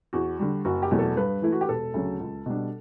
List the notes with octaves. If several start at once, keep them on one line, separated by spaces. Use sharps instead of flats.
E2 F#4
D3 G3
F#1 F#4
G4
E2 B2 F#3 A3
A4
G2 B4
E3 A3 E4
F#4
G4
E1 A4
D2 C#3 F#3
C#2
B2 G3 D4